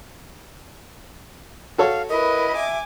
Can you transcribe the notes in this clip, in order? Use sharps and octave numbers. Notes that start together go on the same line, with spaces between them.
F#4 A4 C#5 F5
E4 A#4 B4 D#5
E5 G#5 D6